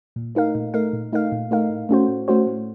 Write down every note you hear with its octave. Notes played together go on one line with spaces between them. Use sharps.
A#2
A3 D#4 A#4 F5
A#2
A3 D#4 A#4 F5
A#2
A3 D#4 A#4 F5
A#2
A3 D#4 A#4 F5
A2
A3 C#4 F#4 C5
A2
A3 C#4 F#4 C5
A2